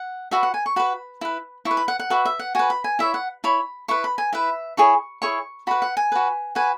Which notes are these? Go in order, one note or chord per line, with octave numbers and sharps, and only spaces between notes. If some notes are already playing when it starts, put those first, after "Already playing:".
Already playing: F#5
F#4 B4 E5
F#5
G#5
C#6
F#4 B4 B5
E4 B4
E4 C#6
B4
B5
F#5
F#5
F#4 B4 E5
E5
F#5
F#4 B4 G#5
B5
G#5
E4 C#5 E5
F#5
E4 C#5 B5
E4 B4 C#6
B5
G#5
E4 B4 E5
E4 G#4 C#5 C#6
E4 G#4 C#5 C#6
F#4 B4 B5
F#5
G#5
F#4 B4
F#4 B4 G#5